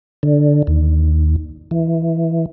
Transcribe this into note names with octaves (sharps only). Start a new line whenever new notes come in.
D3
D#2
E3